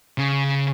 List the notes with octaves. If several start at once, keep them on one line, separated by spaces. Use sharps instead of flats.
C#3